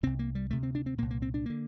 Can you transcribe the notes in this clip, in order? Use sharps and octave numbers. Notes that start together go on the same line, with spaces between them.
C2 C3 C4
A#3
G3
D2 C3 A3
C4
D4
C4
C2 A#2 A#3
A#3
C4
D4
D3 A#3